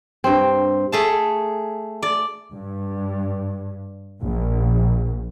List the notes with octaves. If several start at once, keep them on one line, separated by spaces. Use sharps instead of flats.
G2 C4
A3 G#4 A5
D5
G2
A#1